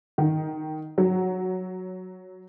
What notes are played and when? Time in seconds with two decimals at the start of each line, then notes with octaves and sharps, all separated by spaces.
0.18 D#3
0.98 F#3